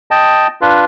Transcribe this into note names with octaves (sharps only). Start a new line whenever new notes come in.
D#5 G5 A5
D4 F4 B4